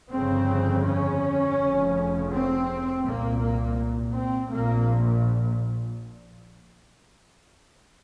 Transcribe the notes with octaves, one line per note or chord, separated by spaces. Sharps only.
G1 F2 C#3 C4
C#4
F1 F2 C#3
C4
C2 A#2 A#3
A#3
C4
A#1 A#2 A#3